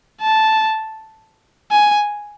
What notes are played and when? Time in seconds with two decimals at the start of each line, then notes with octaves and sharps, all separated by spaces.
0.21 A5
1.72 G#5